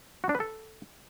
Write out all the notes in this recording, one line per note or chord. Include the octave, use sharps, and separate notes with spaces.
F#4
D4
B4
A4